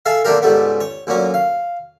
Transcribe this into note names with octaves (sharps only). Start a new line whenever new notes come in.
G#4 A4 E5 F5
A#2 D3 A3 D4 G4 A#4
C#2 G#2 G3 A3 B3
C#5
D2 A#2 F#3 C#4
F5